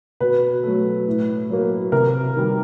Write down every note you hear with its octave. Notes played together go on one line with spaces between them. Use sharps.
B2 B4
F#3 A3
A2
F#3 A#3
C3 A#4
D#3 G3